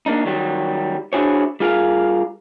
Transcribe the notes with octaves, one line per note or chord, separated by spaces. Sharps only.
A#3 D4 D#4
D#3 F#3 G3
D4 E4 F#4 G#4 C5 C#5
G3 F4 G#4 A#4 F5